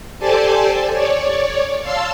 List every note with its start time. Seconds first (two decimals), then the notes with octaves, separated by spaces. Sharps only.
0.19 G4 A4 C5 D5 G#5 A5
0.93 C#5 D5
1.82 F5 A5 C6 E6